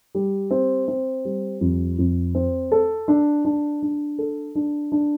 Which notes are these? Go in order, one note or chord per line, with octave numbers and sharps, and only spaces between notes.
G3
C4
C4
G3
F2
F2
C4
A4
D4
D4
D4
A4
D4
D4